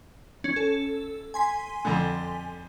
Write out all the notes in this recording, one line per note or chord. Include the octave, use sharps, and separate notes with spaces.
C#4
A4
G#5 C6 B6
F2 D3